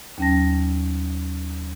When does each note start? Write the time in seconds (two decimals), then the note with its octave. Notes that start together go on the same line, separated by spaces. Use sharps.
0.18 D#2 F#3 C#4 G5 A5 A#6